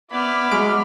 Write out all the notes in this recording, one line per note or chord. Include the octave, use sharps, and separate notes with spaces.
B3 E4 D5 B5 D6 F6
F#3 G#3 D7